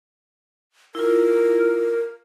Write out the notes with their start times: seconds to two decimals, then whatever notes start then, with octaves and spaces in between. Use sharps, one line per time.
0.95 E4 F4 A#4